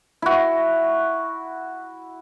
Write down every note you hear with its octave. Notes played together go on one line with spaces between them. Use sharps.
E4 F#4